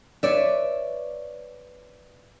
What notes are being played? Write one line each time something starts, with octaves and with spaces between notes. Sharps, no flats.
B4 C#5 D5 E5